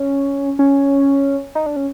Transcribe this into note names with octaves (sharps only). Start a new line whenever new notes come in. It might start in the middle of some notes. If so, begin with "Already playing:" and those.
Already playing: C#4
C#4
D#4
D4
C#4